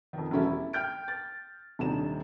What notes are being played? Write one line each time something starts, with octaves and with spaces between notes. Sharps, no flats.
F2 D#3
E1 F#3 A3 C#4 G4 E5
E4
G5 F6 G6 D7
A6
D#1 C3 D4 D#4 E7